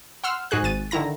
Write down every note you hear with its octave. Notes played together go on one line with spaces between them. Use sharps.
F#5 C6 E6 F6
G#2 F#4 G#4 F#6
G#1 A6 D#7
D3 D#3 E4 A#5 A#6